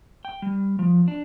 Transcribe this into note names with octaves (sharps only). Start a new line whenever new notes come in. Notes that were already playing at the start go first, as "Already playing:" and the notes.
G5
G3
F3
D4